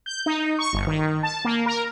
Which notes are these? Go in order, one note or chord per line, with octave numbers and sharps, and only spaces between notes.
G6
D#4
C#6
G1
D#3
A5
A#3
A#4